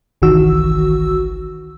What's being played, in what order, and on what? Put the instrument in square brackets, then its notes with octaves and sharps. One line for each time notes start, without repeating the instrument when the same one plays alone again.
[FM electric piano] G1 C2 D#3 E3 F#4 E6